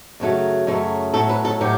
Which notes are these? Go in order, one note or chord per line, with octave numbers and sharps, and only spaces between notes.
F#2 C#3 F#3 A3
F#2 C#3 F#3 A3
A2 F#3 A3 A4
B4
A4
A2 F#3 G4